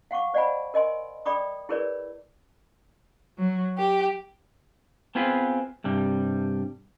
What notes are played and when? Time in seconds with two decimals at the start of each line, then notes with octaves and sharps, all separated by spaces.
0.11 F5 F#5 C#6 D6
0.34 C5 D5 D#5 F#5 G#5 B5
0.74 A#4 D#5 G#5 C6
1.26 A4 D5 G5 B5 D6 D#6
1.69 E4 G#4 A#4 B4 C#5 D5
3.38 F#3
3.78 G4
5.15 B3 C4 F4 G#4 B4
5.84 G2 C3 G3